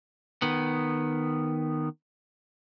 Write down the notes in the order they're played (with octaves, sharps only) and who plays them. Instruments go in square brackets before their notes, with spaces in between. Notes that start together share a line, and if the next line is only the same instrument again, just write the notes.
[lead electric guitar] D#3 B3